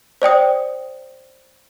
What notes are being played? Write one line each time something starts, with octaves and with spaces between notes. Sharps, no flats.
C5 D5 G5 D#6